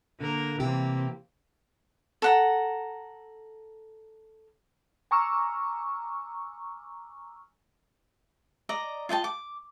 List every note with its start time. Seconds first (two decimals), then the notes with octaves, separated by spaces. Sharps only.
0.20 D3 A#3 A#4
0.60 C3 E3 A#3 C4 G4
2.22 A4 F#5 A#5
5.11 G#5 A#5 C#6 D6 E6 F6
8.69 D5 D#5 A#5
9.09 F4 D#5 G5 A5
9.24 D6